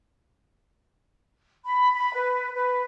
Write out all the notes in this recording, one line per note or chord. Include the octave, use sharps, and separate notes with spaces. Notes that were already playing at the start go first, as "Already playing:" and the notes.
B5
B5
B4
B4